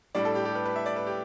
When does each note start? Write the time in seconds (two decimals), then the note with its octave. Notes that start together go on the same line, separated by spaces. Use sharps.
0.15 A2 G3 D4 D5
0.25 A4
0.35 G4
0.45 G4
0.55 B4
0.65 B4
0.76 E5
0.86 D5
0.96 B4
1.07 G4